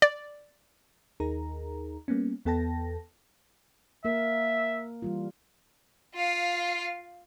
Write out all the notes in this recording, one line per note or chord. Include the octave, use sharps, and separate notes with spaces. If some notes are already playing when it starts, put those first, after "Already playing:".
D5
D#2 D#4 G#4 A#4 A#5
G3 A#3 B3 C#4
E2 B3 A4 G5 A5 A#6
A#3 A#4 E5
E3 G3 F4
F4 F5